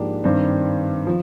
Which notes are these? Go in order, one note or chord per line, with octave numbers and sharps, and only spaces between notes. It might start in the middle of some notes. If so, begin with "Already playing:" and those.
Already playing: G#2 F3 A#3 D4 G4
G2 D#3 G3 C4
F3